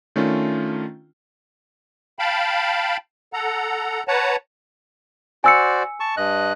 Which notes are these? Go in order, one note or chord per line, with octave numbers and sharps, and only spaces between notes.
D#3 A3 C#4 D4 F4
F5 G5 A5 B5
A4 F#5 A#5
B4 C#5 F#5 A5 A#5
F#4 C5 D5 G#5 E6 C#7
A5 C#6
G2 D#5 F#6